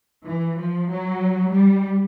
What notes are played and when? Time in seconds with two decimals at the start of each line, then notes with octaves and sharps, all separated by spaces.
0.25 E3
0.57 F3
0.89 F#3
1.53 G3